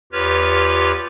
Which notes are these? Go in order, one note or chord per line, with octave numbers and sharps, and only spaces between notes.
E2 F4 G4 B4 C#5 F6